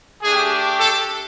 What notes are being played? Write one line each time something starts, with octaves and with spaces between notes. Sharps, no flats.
A3 D4 G4 G#4
A4